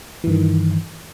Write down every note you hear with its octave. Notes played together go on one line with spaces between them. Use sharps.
G2 D#3 E3